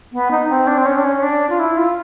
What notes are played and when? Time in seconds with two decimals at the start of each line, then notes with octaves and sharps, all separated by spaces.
0.12 B3
0.31 D#4
0.49 C4
0.67 D4
0.78 C4
0.86 C#4
0.98 D4
1.04 C#4
1.23 D4
1.50 F4
1.59 E4
1.77 F4